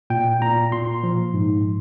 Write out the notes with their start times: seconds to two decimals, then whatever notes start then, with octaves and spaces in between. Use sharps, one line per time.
0.10 A#2 G5
0.42 A#2 A#5
0.72 A#2 C6
1.04 F3
1.34 G#2